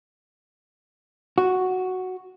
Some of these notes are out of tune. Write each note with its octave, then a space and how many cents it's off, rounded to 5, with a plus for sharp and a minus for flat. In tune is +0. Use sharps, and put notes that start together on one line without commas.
F#4 +0